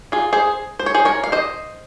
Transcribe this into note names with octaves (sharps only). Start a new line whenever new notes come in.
F4 G#4
G#4 C5
C5
C#5
G#4 C5
A#4 C#5
F5
C5 D#5